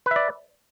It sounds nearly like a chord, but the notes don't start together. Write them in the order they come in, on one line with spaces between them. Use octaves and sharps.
B4 E5 D5